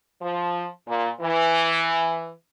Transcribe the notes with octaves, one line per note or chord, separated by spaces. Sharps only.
F3
A#2
E3